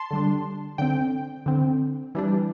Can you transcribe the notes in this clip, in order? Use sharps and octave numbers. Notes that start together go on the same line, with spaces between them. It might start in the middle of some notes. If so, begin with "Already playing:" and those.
Already playing: A5 C6
D3 G3 D4
D3 C4 G5
D3 C4
E3 G3 D4